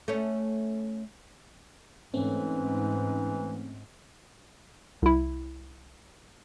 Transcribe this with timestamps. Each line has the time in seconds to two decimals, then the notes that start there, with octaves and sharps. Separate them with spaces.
0.08 A3 C#4
2.14 G#2 E3 A3 C4 C#4
5.02 C2 E4